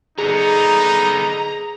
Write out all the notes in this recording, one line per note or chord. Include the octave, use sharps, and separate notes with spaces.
D3 B3 D#4 G#4 A#5 C#7